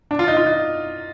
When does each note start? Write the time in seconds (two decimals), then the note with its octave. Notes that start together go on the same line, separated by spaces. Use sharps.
0.11 D4
0.19 F4
0.28 D#4
0.37 F4
0.46 D#4